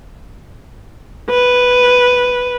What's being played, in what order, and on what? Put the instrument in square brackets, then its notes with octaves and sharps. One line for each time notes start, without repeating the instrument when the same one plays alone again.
[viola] B4